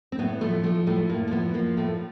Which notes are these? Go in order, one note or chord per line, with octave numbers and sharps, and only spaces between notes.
C4
A2 B3
F3 A3
F3 A3
A2 A3
A2 A#3
A#3
F3 B3
F3 A#3
A2 A3